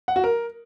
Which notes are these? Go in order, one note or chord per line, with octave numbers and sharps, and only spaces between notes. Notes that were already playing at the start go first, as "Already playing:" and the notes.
F#5
F#4
A#4